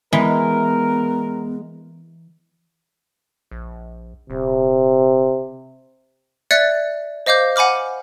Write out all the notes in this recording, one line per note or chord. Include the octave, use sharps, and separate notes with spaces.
E3 G#3 B3 A#4
A#1
D#1 C3
D5 E5 F#6 G#6 A6 C#7
C5 D#5 F5 D6 G6
F#5 G#5 B5 D6 F6